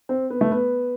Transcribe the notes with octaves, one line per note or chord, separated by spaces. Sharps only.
C4
B3
A3
B3